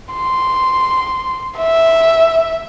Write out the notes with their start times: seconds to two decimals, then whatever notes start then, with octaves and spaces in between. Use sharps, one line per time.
0.14 C6
1.58 E5